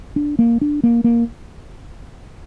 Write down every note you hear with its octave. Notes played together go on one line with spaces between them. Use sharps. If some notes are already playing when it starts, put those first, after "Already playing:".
D4
A#3
D4
A#3
A#3